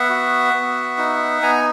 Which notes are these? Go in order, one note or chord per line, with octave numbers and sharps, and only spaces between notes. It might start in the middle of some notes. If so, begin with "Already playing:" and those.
Already playing: B3 E5 F#5
F#4
B3
D#4
B3 G#5 A#5